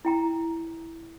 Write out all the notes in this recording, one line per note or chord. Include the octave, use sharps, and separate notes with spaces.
E4 G5 A#5